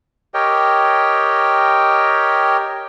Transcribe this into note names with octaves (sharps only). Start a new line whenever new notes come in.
G4 A#4 C#5 D#5 G5